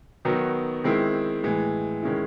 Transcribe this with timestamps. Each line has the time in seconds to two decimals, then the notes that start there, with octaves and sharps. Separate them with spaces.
0.25 D#3 F#3 B3 D#4 F#4
0.84 D#3 G#3 C4 E4
1.43 A2 E3 G#3
2.03 D#3 G#3 C#4 E4